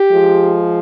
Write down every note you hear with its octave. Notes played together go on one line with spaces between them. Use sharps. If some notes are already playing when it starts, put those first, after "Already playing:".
Already playing: G4
F3 G#3